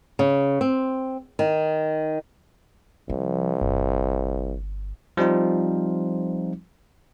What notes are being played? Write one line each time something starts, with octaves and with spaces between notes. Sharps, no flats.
C#3
C4
D#3
C2 F3
G1
F3 G3 C4 D#4 F4